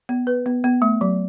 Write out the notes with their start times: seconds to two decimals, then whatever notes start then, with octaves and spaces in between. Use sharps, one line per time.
0.09 B3
0.27 B4
0.46 B3
0.64 B3
0.82 A3
1.01 F#3